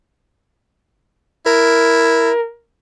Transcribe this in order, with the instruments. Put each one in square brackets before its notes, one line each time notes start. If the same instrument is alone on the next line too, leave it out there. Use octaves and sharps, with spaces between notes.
[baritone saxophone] E4 [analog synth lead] A#4